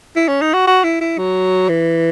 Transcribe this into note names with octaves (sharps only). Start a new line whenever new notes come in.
E4
C#4
D#4
F#4
F#4
E4
E4
F#3
E3